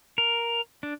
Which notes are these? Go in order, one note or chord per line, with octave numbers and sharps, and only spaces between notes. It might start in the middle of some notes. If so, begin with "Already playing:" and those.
A#4
D4